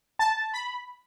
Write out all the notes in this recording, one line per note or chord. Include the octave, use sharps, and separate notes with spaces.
A5
B5